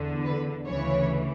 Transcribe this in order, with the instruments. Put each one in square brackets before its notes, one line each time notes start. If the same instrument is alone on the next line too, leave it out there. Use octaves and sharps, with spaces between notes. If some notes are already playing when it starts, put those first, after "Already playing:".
Already playing: [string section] E2 D3
B4
D2 C#3 E3 C#5